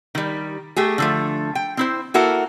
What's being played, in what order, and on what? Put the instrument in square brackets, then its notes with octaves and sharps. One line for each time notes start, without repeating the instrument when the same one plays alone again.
[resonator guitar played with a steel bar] D#3 G3
A3 G4 G#4
D3 F3 A3
G5
C4 E4 C5
A#3 E4 F#4 A4 A#4